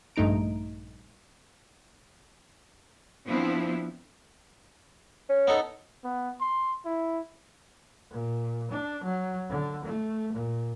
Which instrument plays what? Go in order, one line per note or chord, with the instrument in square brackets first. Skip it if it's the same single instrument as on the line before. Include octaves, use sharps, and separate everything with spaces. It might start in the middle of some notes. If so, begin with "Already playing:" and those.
[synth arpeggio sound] A#1 G2 A3 D#4 A#5 D7
[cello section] F3 B3 C4 D4 E4
[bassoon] C#4
[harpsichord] B3 D#4 A4
[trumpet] B3
C6
E4
[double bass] A#2
D4
F#3
D3
A3
A#2